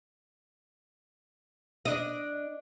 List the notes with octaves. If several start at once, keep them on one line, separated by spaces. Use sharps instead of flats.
D4 D#5